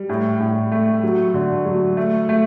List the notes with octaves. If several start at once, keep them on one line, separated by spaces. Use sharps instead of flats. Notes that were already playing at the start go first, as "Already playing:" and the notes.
Already playing: G3
A2
A2
A3
F#3
D3
F#3
A3
A3